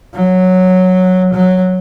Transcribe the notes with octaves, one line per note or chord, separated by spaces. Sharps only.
F#3
F#3